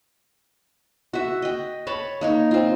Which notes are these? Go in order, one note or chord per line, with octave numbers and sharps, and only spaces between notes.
F#4 E5
D#5 G5
C#5 A5 B5
A#3 D#4 C#5
C4 F4